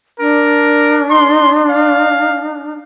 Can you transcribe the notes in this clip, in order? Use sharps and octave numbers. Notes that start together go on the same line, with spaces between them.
D4 A#4
C6
F5